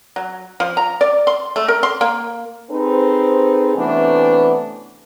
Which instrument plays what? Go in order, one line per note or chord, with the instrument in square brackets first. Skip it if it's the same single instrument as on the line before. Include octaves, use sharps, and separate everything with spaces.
[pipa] F#3
F3
A#5
D5
C6
A3
A#4
C6
A#3
[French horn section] C4 D#4 G#4 A4 B4 C5
C3 E3 A3 B3 C#4 D4